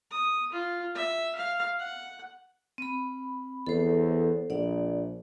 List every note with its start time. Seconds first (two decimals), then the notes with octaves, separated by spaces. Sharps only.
0.11 D#6
0.52 F4
0.95 E5
1.35 F5
1.79 F#5
2.78 C4 B5
3.67 E2 A4 C5
4.50 A#1 D5 F#5